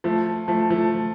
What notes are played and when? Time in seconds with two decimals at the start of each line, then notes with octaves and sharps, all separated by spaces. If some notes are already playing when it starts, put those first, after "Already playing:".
0.04 F3 A3
0.48 F3 A3
0.70 F3 A3